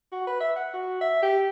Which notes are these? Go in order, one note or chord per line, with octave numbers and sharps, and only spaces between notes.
F#4
B4
E5
F#5
F#4
E5
G4